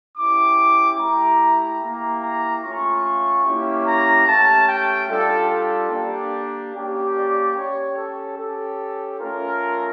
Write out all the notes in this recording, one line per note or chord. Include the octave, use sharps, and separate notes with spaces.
C#4 E4 G4 D6
A3 E4 G4 A#5
A#3 E4 G4
A#5
A3 C#4 F4 C#6
A#3 C#4 E4 G4
A#5
A3 C#4 G4 A5
G5
G3 D4 F4 A4
A4
A#3 D4 G4
A#3 C#4 G4
D5
C#4 G4 C#5
A4
C#4 G4 A4
A3 C#4 F4 A#4